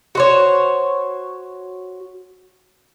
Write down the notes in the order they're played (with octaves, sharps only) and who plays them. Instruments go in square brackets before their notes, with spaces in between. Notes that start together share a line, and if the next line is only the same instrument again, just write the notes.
[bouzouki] F#4 C5 C#5